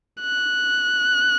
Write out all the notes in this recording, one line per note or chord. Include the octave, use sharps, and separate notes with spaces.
F#6